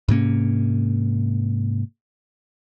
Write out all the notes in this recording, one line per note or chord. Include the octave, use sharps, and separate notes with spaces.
G#2 C3 A#3 C#4